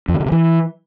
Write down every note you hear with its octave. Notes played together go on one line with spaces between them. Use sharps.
F2
D#3
D3
C3
E3